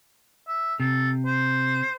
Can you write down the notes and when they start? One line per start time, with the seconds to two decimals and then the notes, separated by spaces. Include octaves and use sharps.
0.48 E5
0.80 C3 A4
1.26 C5